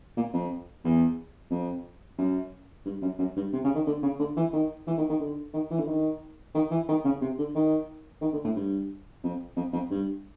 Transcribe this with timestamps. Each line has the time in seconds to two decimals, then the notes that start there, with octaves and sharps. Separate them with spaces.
0.17 A#2
0.33 F2
0.84 E2
1.51 F2
2.18 F#2
2.85 G2
3.02 F#2
3.19 F#2
3.36 G2
3.53 C3
3.64 C#3
3.75 D#3
3.87 D3
4.03 C#3
4.19 D3
4.37 E3
4.53 D#3
4.87 E3
4.98 D#3
5.10 D#3
5.20 D3
5.54 D#3
5.71 E3
5.79 D3
5.88 D#3
6.55 D#3
6.71 E3
6.89 D#3
7.05 C#3
7.22 C3
7.38 D3
7.55 D#3
8.22 D#3
8.33 D3
8.44 A2
8.56 G2
9.24 F2
9.56 F2
9.73 F2
9.91 G2